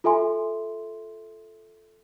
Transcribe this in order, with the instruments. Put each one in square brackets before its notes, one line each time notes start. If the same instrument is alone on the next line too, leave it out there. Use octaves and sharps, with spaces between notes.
[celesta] F4 A4 E5 G#5 C6